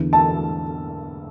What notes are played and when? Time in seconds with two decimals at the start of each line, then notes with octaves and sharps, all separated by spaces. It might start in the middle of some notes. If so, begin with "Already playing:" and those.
Already playing: E2 D3
0.13 A5